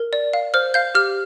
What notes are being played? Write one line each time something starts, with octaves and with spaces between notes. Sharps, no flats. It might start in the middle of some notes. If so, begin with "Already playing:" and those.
Already playing: A#4
D5
F5
C5 F6
F5 G6
G4 F6